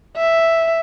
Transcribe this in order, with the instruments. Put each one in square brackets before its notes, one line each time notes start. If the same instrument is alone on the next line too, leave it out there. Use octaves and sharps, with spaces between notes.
[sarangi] E5